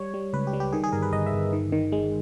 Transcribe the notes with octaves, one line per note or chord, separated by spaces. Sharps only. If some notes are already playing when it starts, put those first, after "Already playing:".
Already playing: G3 C#5
G3
C#2 B4
G4
G3
G4
D#3 G#4
G#4
G1 A#4
B4
G1 D#5
E5
G1
D#3
D#3
G#3